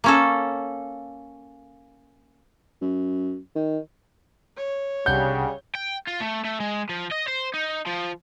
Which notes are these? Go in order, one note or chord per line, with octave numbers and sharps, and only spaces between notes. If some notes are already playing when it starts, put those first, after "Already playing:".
A#3 C#4 A4
F#2
D#3
C#5
C2 C#3 G3 D4 F#5 G6
G5
F4
A3
A3
G#3
F3
D#5
C5
D#4
F3